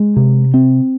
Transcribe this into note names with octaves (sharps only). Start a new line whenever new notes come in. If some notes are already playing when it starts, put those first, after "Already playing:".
Already playing: G#3
C3
C4